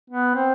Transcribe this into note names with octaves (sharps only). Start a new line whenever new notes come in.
B3
C4